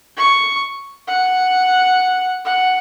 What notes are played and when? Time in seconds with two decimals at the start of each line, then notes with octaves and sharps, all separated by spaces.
0.17 C#6
1.07 F#5
2.45 F#5